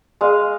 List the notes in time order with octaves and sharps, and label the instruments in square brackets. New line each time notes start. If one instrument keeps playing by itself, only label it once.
[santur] G#3 D#5 F5